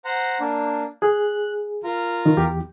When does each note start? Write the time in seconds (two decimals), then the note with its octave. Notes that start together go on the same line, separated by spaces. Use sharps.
0.05 C5 F#5 A#5
0.40 A#3 D4
1.02 G#4 F#6
1.84 F4 A#4
2.26 D#3
2.37 E2 G4